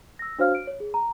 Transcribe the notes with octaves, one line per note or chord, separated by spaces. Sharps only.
E6 A#6
D4 F#4 C5 C#5 F5 F6
D7
C#5
G#4
A#5